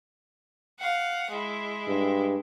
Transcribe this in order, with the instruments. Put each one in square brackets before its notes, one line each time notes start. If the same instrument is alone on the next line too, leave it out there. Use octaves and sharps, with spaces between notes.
[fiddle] F5 F#5
G#3 E4
[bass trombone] G2